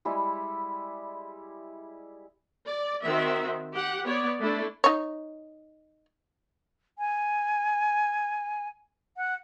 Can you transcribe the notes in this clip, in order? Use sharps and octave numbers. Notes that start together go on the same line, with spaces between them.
G3 G#3 E4 G#4
D5
D#3 C4 F#4 E5
G4 F#5
B3 C#5 D5
A3 D4 E4
D#4 C#5
G#5
F#5